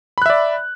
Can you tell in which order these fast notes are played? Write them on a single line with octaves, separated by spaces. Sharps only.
B5 F#6 E5 D5